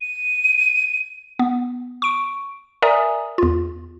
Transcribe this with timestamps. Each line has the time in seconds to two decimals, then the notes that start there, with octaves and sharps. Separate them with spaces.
0.01 D#7
1.39 B3
2.02 C#6 D7
2.82 A#4 D5 E5 G#5 A#5 D#6
3.38 E2 F4